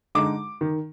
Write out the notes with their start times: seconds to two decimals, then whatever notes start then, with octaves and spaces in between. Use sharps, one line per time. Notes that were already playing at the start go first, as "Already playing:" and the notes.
0.15 D3 G#3 D#4 D6
0.61 D#3